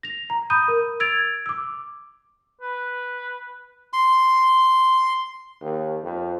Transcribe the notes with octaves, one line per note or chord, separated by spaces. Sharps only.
A#6 F7
A#5
B5 D#6 G6 D#7
A#4
E6 G#6 A6 D7 F7
D6 E6
B4
C6
D#2
F2